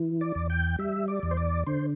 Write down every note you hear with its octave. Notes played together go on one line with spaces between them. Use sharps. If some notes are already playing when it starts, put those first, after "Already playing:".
Already playing: E3
D5
E2
G5
G3 E5
D5
E2
C5
D5
D3 C5